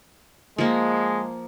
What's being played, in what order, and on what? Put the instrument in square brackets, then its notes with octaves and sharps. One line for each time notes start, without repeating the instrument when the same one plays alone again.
[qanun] F3 A#3 [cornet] G#3